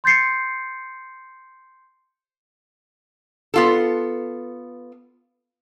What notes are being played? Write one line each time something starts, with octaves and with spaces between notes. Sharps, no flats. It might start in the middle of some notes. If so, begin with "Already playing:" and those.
C6 G6 A6 C7 C#7
B3 F4 A4